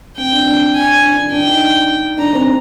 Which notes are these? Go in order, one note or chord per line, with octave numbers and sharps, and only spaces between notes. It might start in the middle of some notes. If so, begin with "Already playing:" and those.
C4 G5
D4
D4
G#5
D4
D4
D4 G5
D#4
D4 A#5
C4